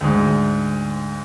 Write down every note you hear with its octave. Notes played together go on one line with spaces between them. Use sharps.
D2 G#2